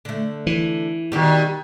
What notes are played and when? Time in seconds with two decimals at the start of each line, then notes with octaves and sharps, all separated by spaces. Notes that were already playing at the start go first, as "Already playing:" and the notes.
0.05 D3 A3
0.47 E3
1.12 B2 D#3 G3 G4